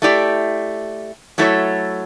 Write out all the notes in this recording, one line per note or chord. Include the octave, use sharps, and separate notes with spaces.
A3 E4 G4 D5
F#3 A3 E4 A4 C#5